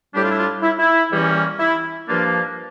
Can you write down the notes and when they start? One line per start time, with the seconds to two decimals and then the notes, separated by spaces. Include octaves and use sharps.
0.14 A2 G3 D4 G4
0.22 F4
0.30 E4
0.38 F4
0.62 E4
0.79 E4
1.12 E2 E3 G3 A#3 C#4
1.59 E4
2.07 G2 F3 A#3 D4 F4